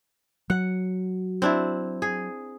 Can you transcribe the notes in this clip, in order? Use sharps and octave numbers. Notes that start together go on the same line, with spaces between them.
F#3 F#5
C4 D4 E4
G#4